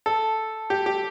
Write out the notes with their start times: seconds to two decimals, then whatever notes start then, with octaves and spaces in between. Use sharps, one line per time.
0.06 A4
0.70 G4
0.86 G4